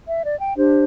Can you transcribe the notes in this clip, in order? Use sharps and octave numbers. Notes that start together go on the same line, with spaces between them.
E5
D5
G5
D4 G4 C5